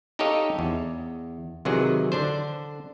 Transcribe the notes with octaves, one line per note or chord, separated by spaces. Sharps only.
D#4 G4 A4 C#5 D#5 F5
E2
C3 D#3 E3 F#3 G#4
D3 D4 C5